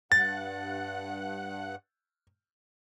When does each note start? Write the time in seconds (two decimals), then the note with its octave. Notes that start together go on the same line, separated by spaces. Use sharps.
0.12 G2 F#5 F#6 A6